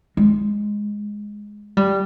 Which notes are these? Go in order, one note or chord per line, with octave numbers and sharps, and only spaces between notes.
G#3
G3